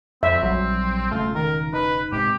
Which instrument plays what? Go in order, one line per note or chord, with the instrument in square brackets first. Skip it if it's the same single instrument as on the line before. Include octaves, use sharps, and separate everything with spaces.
[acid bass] F2 [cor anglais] C4 [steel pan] E5
[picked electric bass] A#1 G3 [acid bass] F#3
[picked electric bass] E1 C#3 [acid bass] A3 [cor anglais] F4
[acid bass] D#3 [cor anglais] A#4
[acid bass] D#4 [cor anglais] B4
[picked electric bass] G#2 C3 [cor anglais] G4